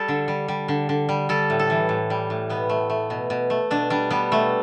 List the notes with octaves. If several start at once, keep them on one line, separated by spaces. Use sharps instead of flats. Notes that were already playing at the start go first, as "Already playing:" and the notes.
Already playing: G3 G4 A4
D3
G3
G3
D3
D3
G3
G3 A4
A2
A4
E3
A2
G3
A2
B2 B3
A3
A3
B2
B2
A3
B2 D4
G3 D4
G3 B3
B2 A3